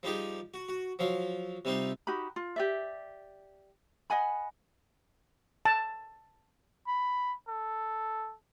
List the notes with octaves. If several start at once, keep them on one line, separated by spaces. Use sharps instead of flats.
F3 G3 D#4 G4 G#4
F#4
F#4
F3 F#3 F5
C3 G3 C4 D#4 F4
D#4 F#4 G4 B5
F4
G4 D5 E5
D#5 F#5 G#5 B5
A5
B5
A4